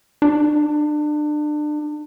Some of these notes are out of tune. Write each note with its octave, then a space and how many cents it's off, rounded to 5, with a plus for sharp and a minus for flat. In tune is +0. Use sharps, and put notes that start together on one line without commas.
D4 +30